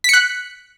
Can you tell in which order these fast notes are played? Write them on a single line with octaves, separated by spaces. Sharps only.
B6 C#7 F#6